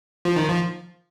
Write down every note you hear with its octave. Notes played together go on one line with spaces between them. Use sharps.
F3
D#3
F3